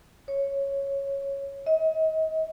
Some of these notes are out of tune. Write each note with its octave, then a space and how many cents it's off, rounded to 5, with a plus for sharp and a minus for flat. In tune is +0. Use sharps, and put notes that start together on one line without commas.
C#5 -5
D#5 +35